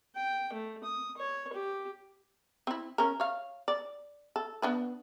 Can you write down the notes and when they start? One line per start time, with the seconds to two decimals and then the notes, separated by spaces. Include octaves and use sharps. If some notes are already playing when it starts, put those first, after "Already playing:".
0.15 G5
0.53 A3
0.84 D#6
1.17 C#5
1.53 G4
2.67 C4 E4
2.98 C#4 A#4
3.20 C#5 F5
3.68 D5
4.36 A4
4.62 B3 D4 B4